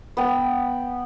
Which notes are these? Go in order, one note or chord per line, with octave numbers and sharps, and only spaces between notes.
B3 G5